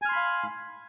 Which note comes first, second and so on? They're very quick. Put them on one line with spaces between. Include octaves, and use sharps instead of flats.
G#5 F6 C6 B5 F5